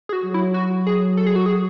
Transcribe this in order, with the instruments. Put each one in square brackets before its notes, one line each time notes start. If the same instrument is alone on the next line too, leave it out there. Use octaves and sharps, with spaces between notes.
[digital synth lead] G#4
F#4
[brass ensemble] F#3
[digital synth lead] E4
F#4
G#4
A4
G#4
F#4
G#4